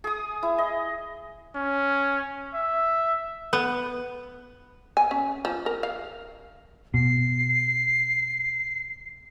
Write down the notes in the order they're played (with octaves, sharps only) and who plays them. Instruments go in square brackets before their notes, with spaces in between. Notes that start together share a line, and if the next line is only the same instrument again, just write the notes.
[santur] G#4 D#6
E4
D#5
[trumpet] C#4
E5
[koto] B3
[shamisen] G#5
C#4
F3
A#4
F5
[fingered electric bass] B2 [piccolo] C7